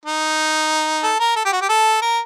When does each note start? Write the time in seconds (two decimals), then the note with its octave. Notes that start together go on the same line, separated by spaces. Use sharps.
0.05 D#4
1.03 A4
1.20 A#4
1.36 A4
1.45 G4
1.53 F#4
1.61 G4
1.69 A4
2.02 A#4